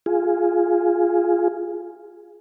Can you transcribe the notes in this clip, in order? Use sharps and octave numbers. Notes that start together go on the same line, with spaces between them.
F4 G#4